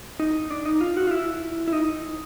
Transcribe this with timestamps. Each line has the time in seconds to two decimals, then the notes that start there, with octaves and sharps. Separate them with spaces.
0.20 D#4
0.51 D4
0.65 D#4
0.81 F4
0.97 F#4
1.07 F4
1.11 E4
1.68 E4
1.73 D#4